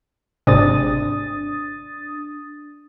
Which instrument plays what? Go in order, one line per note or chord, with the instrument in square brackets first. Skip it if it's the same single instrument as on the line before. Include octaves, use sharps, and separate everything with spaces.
[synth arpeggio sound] G#1 G#2 C3 [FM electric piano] D4 D#6 A6